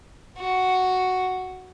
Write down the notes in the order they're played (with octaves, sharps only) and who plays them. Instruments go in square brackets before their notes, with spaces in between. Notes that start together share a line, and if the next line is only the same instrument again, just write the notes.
[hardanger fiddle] F#4